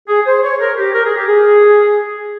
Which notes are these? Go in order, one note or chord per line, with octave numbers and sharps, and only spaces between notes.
G#4
C5
C#5
A#4
G4
A#4
G#4
G4
G#4